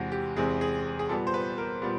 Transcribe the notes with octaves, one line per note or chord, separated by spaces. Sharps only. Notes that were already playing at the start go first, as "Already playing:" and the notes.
Already playing: E2 C3 E3 G#3 C4 F#4
G4
E2 C3 E3 G#3 C4 G#4
G#4
G#4
A#2 G3 B3 A4
C5
B4
A#4
A#2 G3 B3